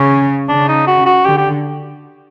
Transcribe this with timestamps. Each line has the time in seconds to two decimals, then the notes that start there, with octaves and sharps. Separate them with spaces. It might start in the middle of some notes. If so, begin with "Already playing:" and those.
Already playing: C#3 C#4
0.49 C#3 D4
0.68 D#4
0.87 F#4
1.06 F#4
1.25 D3 G4
1.38 G4